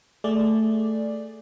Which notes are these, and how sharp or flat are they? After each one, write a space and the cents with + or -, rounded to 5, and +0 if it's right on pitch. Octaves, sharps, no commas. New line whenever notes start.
A3 +0 G#4 +0 D5 +0